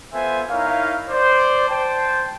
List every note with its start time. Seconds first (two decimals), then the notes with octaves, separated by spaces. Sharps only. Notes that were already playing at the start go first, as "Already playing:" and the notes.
0.12 B3 F4 A4 C5 E5 G#5
0.49 D#4 E4 A#4 C#5 F5
1.09 C5 D5
1.68 C5 G5 A5